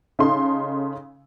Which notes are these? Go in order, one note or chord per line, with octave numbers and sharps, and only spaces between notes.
C#3 D#4 A4 C6